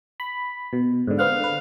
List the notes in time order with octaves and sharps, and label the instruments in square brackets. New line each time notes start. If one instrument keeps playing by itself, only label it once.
[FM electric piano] B5
B2
G#2 D3
[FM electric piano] B3 C4 F#5 [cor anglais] F5
[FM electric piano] D3 B4